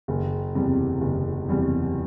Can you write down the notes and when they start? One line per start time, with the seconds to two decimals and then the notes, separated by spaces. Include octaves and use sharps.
0.08 F#1
0.55 E2 C3 G3
1.01 F#1
1.49 E2 C3 G3